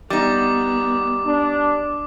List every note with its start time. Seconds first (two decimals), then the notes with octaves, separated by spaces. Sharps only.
0.10 G3 B3 D#4 D6
1.25 D4